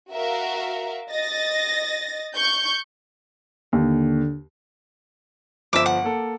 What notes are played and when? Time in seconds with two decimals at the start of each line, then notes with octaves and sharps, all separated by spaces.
0.11 F#4 A#4 E5 F5
1.11 D#5 A6 A#6
2.35 C#6 G6
3.73 D#2 D3
5.73 G1 F3 E5 D6 D7
5.86 F#5
6.03 A#3 A4